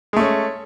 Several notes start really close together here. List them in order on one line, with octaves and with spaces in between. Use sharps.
G#3 A3 C#4